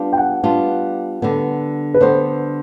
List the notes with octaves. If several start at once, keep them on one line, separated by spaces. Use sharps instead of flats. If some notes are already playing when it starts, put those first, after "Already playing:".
Already playing: G3 B3 D4 F4
G5
F#5
G3 B3 D4 F4
D3 G3 B3
B4
D3 G3 B3 C5